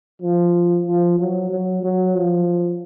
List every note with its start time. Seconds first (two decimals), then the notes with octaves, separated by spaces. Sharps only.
0.22 F3
0.87 F3
1.19 F#3
1.50 F#3
1.83 F#3
2.15 F3